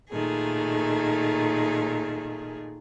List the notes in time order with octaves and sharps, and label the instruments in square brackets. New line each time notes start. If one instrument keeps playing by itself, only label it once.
[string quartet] A#2 D#3 A3 G#4